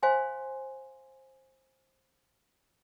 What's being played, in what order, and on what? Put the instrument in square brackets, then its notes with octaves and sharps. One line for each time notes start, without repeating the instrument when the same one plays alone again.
[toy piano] C5 F5 G#5 C6